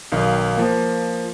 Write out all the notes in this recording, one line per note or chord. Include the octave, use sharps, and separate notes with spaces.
B1 D#3 F5
F3 A#3